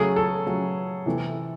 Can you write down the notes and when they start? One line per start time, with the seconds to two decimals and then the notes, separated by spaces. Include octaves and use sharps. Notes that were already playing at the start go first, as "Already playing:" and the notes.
Already playing: C#3 F#3 A3 G#4
0.16 A4
0.46 C#3 F#3 A3
1.06 C3 E3 A3